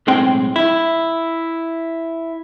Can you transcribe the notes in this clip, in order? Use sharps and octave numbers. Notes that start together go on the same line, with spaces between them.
B1 A2 G#3 C4 G5
E4